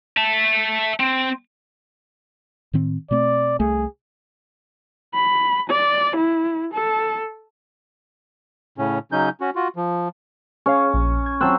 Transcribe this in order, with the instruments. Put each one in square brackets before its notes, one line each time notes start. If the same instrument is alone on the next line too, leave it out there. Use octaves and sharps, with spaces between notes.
[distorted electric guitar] E5 A5
C4
[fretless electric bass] A2 D#3 C4
[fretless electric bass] B2 A3 C4 [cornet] D5
[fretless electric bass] C2 A3 [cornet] G#4
[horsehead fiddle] B5
D5
E4
A4
[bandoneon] A2 C#3 C#4
C#3 F#3 C#4 D#4 G6
C#4 F#4
F4 F#4
F3
[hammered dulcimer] C#4 [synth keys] G#4 C#5 F5
[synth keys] A#1
G#6
[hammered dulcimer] F#3 C4 [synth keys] A5 E6 F#6